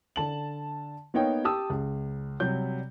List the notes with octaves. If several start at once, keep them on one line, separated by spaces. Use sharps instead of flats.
D3 A5 F#7
A#3 B3 D#4 C#5 G5
G4 A5 D#6 E6
C#2
C3 F#3 G3 G6